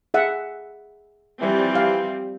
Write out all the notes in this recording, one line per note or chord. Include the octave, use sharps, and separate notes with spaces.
G#4 E5 F#5
E3 F3 G3 C4
F5